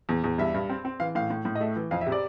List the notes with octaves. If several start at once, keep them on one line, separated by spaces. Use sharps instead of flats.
E2
E2
G2 E5
G2
C4
C4
E3 F5
A2 F5
A2
A2
D#5
A3 E5
E3
F2 F5
E5
C3
D5